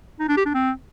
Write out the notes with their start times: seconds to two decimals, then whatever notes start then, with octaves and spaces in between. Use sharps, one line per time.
0.20 D#4
0.28 D4
0.37 G4
0.46 D4
0.54 C4